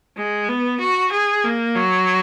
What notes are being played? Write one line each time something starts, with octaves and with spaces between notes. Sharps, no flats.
G#3
B3
F#4
G#4
A#3
F#3